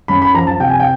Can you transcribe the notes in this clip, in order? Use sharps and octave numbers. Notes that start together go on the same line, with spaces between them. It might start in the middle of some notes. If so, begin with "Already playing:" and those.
F#2 B5
B5
F3 A#5
A5
C3 G5
G#5
G5